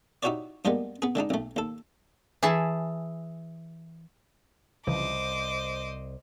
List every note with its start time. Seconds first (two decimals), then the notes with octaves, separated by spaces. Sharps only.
0.23 D#4 E4 F#4 G4 C#5 D5
0.65 G2 G3 G#3 A#3 B3
1.02 B3 G#4
1.15 D3 G#3 D4 D#4
1.30 B1 A3
1.56 D#2 A4
2.43 E3 G#4 E5 A5
4.87 C2 C#3 E3 F3 C5 D#5 D6